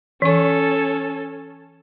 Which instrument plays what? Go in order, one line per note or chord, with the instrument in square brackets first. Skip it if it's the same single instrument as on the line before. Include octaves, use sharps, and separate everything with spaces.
[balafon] E3 C#6 [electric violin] C#4 A4